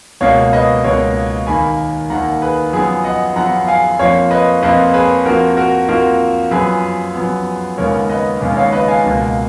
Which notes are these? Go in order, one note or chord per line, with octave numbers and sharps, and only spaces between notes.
C#2 B2 A#3 C#5 F5
B4 D#5
C#2 B2 A#3 A#4 C#5
D#2 D#3 A#3 G#5 B5
D#2 D#3 A#3 F#5 A#5
G#4 B4
F#2 F3 B3 G#4
D#5 F#5
F#2 F3 B3 F#5 A#5
F5 G#5
F2 F3 A#3 C#5 F5
B4 D#5
F2 F3 A#3 B4 D#5
G#4 B4
F2 F3 A#3 F#4 A#4
F#4 A#4
F2 F3 A#3 F#4 A#4
F#2 F3 B3 G#4 B4
F#2 F3 B3
D#2 C#3 G#3 B3 A#4 C#5
B4 D#5
D#2 C#3 G#3 B3
C#5 F5
B4 D#5
F5 G#5
C#2 B2 A#3